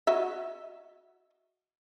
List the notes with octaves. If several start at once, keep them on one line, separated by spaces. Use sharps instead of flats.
F#4 D#5 E5